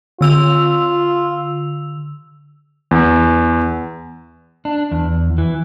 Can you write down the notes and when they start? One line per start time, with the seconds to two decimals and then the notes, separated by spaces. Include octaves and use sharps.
0.21 D3 F4 E6 F7
2.91 E2
4.65 D4
4.91 E2
5.38 E3